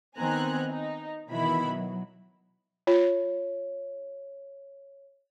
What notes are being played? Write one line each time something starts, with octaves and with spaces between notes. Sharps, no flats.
D#3 B3 C4 G#5 A#5 F#6
D#4
B2 D#3 E3 B3 E4 B5
F#3
F4 C#5